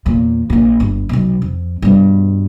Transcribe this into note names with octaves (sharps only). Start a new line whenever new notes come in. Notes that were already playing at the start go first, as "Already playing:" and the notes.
E2 A#2
A#1 A#2
G1
B1 B2
F2
G2 B2